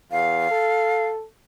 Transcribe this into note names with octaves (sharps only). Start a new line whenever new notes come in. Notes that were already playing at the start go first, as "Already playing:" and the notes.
E2 F5
A4